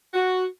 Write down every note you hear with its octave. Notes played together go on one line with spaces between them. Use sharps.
F#4